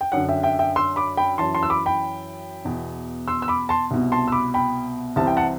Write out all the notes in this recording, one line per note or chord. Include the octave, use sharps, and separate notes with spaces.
G5
F#2 D3 F#5
E5 G5
E5 G5
E5 G5
C6 E6
B5 D6
G5 B5
F#2 E3 A5 C6
A5 C6
E6
B5 D6
G5 B5
E2 B2
C6 E6
E6
B5 D6
A5 C6
C2 B2
A5 C6
E6
B5 D6
G5 B5
C2 C3 E3 A5
G5
F#5 A5